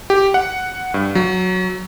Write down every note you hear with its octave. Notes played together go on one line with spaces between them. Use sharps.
G4
F#5
G2
F#3